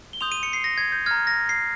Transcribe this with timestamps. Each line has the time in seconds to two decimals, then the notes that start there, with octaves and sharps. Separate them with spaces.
0.13 G7
0.21 C6 D#6 G6 F7
0.32 D#7
0.43 C#7
0.53 C7
0.64 A#6
0.78 G#6
0.92 G6
1.06 A#5 F6 G#6
1.27 A#6
1.49 C7